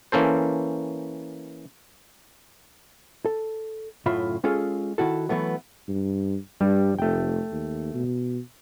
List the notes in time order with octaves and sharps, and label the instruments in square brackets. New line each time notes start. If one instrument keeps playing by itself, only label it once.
[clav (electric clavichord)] E3 A#3 C#4 A4 C5
[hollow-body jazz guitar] A4
F#2 A2 C#3 F4 E5 B5
G#3 C#4 F4 G#4 A4
D#3 E4 F#4 A4
E3 F#3 A3 B3
[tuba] G2
[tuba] G2 [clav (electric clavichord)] G3
[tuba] F1 [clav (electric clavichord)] A3 G5
[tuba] D#2
B2